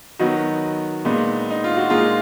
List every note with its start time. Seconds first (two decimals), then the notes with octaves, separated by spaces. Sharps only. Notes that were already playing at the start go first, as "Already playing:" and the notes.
0.19 D#3 F#3 B3 D#4 F#4
1.05 A#2 G#3 B3 D#4
1.50 D#4
1.64 F4
1.77 F#4
1.90 A#2 G#3 D#4 F4 G#4